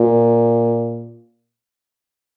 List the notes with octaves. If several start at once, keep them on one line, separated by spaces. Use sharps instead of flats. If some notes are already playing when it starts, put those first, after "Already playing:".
Already playing: A#2